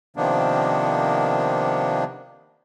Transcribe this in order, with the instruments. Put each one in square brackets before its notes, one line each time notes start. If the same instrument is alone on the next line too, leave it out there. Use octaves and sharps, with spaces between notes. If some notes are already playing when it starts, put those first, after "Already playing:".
[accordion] C3 D#3 F3 A#3 B3 D4